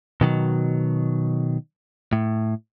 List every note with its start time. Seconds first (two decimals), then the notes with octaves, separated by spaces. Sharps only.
0.21 B2 D#3 F#3
2.13 A2